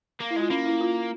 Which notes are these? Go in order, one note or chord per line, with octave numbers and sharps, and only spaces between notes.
A#3
E4
G#3 F4
A#3 C#4
E4
F4